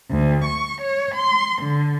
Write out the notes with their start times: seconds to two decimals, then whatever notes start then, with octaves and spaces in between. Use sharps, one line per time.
0.11 D2
0.44 C#6
0.81 C#5
1.16 C6
1.63 D3